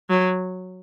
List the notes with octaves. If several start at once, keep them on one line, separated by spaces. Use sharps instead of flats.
F#3